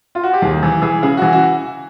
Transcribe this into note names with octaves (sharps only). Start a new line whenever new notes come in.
F4
F#4
G4
D#2 G#4
E3
E3 G#4
C#3 G#4
E3 F#4
F#4